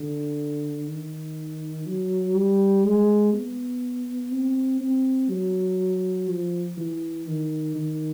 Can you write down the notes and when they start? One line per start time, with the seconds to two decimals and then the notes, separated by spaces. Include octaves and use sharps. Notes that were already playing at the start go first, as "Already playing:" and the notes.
Already playing: D3
0.87 D#3
1.86 F#3
2.34 G3
2.84 G#3
3.34 B3
4.31 C4
4.80 C4
5.30 F#3
6.28 F3
6.77 E3
7.26 D#3
7.76 D#3